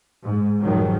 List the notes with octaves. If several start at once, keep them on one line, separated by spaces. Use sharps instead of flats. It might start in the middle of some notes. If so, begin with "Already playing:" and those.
G#2
F1 G#2 D#3 F3 F#3